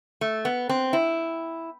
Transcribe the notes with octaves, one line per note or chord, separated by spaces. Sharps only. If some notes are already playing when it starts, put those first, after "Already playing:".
A3
B3
C4
E4